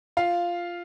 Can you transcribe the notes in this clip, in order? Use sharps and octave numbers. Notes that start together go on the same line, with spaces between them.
F4 F5